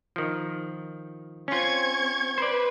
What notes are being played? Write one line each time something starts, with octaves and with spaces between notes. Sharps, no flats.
D#3 F3
C4 C#4 F4 C#6 G#6
B4 C5 D5